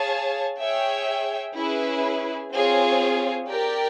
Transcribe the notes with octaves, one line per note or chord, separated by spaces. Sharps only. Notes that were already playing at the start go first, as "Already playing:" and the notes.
Already playing: G#4 C#5 F5 A5
G#4 C#5 E5 G5
C#4 E4 G#4 B4
C4 F4 G#4 C#5
G4 A#4 D5 G5